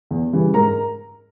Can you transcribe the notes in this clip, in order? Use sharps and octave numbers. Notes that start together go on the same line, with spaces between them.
E2
C#3 E3 G3
G#2 A#4 A#5